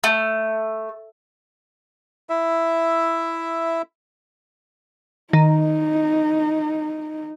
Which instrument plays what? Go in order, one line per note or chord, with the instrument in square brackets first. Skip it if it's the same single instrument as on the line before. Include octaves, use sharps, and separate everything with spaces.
[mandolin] A3
[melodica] E4 E5
[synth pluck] D#3 [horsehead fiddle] D#4